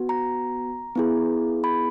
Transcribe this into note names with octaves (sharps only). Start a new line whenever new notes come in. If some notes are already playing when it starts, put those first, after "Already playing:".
Already playing: B3 F#4
A#5
B3 E4 G#4
B5